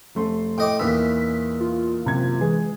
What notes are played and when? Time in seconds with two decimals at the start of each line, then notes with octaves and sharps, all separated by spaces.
0.15 F1 A3 C6
0.58 A2 D#5 G5 D6
0.79 E2 A#2 E3 D#4 E6 B6
1.60 F4
2.05 F#1 C3 G#6
2.41 E3 G#3 G#4